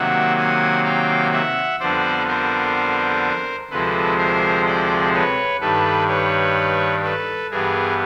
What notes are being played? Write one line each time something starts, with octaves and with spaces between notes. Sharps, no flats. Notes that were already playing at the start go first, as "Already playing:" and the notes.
Already playing: C3 D#3 F#3 A#3 E5 F#5
F#5 G#5
F5 G5
E5 F#5
F2 D3 G3 B3 C5 D5
A#4 C5
D2 C3 F3 G#3 C4 A4 B4
A#4 C5
C5 D5
B4 C#5
G2 D#3 G3 A4 B4
B4 C#5
A4 B4
G2 E3 G3 B3 G#4 A#4